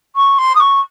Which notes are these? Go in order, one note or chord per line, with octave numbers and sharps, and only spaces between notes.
C#6
C6
D#6
C#6